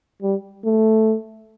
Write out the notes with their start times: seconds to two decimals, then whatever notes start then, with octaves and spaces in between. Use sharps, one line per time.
0.22 G3
0.65 A3